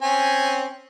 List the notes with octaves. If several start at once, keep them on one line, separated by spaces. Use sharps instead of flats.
C4 C#4 G#5